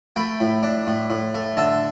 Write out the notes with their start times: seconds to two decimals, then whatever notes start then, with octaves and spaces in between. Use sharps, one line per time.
0.16 A3 G5 B5
0.40 A2
0.63 D4
0.87 A2
1.10 A2
1.34 A3
1.57 D3 E5 A5